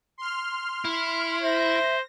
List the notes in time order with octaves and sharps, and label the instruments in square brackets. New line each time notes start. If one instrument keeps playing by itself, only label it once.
[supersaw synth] C6 F6
[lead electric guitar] E4
[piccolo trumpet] C5 [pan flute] E5 [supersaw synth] A#6